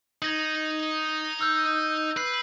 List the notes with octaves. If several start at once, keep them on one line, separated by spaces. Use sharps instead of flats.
D#4 G#6 A#6 F#7
E6 F6 G6
B4 F#6 C7